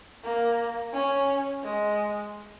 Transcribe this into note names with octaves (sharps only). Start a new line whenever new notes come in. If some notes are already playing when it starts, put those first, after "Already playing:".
A#3
C#4
G#3